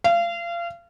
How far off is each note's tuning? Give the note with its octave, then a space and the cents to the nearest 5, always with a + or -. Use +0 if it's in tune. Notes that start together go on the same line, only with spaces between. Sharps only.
F5 -30